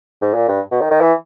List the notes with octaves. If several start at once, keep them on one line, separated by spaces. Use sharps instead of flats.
G#2
A#2
G2
B2
D#3
D#3
E3